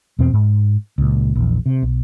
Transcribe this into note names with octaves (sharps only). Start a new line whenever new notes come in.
E2 B2 C4
G#2
C#2 A#2
A#1 E2
C3
B1